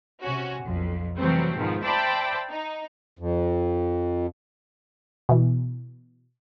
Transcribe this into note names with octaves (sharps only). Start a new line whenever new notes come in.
C3 C#4 F#4
B1 F2
C3 E3 F#3 G3 A3 C4
G#2 B2 D#3 F3
C5 D5 E5 G5 A5 B5
D#4
F2
B2 E3